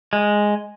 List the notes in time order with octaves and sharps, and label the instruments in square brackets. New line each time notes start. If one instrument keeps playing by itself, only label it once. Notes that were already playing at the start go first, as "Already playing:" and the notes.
[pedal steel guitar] G#3